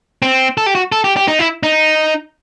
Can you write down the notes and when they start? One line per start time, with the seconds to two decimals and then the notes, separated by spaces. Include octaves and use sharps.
0.22 C4
0.58 A4
0.66 G4
0.75 F#4
0.92 A4
1.04 G4
1.17 G4
1.28 D#4
1.39 E4
1.63 D#4